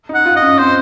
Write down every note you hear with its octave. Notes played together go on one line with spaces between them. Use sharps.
D#4
F#5
F4
D#5
C#4
C4 C5